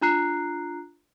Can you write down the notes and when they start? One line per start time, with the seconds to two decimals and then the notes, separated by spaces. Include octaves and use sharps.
0.01 D4 F4 A#5 F#6 C7